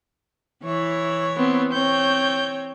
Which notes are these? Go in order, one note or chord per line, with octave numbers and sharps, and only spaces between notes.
E3 E4 C#5
B3 C4
C4 C#5 G6